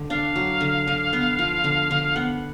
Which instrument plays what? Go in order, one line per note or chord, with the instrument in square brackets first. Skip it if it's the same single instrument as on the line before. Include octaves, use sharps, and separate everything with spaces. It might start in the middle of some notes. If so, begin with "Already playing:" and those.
Already playing: [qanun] D3
[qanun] D4 [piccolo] F5
[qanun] F#3
D3
D3
B3
F3
D3
D3
[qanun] B3 [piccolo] F#5